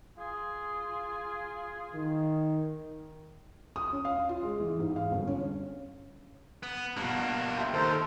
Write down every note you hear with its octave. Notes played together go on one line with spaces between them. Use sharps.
F4 G#4
D#3
D#6
C#4
F5
F4
G#3
E3
G#2
F5
G1
C#4
B3
G2 B2 A#3 D4
G4 E5 C6 G6
D#2 A3 A4 A#4 C5